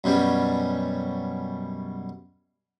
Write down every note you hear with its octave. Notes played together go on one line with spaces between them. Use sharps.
F#2 B2 G3 C#4